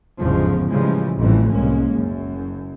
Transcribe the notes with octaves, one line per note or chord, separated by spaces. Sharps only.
G1 E2 G#2 C#3 F3
A2 C#3 E3 F3 G3 G#3
A1 F2 A2 E3 G3
C2 G#3 A#3 C#4
F#1 F#2